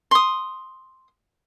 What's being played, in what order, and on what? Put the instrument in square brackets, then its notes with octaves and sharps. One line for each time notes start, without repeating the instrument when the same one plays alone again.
[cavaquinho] C6 D#6